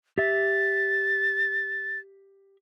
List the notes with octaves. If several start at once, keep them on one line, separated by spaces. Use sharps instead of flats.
G4 E5 A6